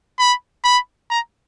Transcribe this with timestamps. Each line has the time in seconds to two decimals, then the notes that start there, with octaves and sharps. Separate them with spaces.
0.19 B5
0.64 B5
1.10 A#5